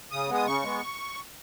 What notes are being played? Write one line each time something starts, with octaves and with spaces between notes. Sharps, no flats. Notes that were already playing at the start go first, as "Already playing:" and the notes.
C#3 D#6
G#3 B3
D#6
C#3 C#6
G#3 B3